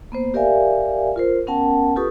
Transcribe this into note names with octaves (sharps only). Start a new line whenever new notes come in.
A#3 B3 C5
G4 A#4 D5 E5 F5 G#5
F4 A#4 C5
B3 C#4 A#4 F#5 G5 A5
F4 G4 A4 B4 C#6 D#6